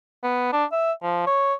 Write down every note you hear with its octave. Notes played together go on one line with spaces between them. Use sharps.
B3
D4
E5
F3
C#5